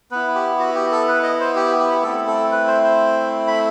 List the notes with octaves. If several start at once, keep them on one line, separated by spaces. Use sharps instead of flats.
B3 E4 B4
G4
F#4
G4
A4
B4
D#5
C5
G4
G4
A3 C4 E4 A4
A4
B4
C5
C5
B5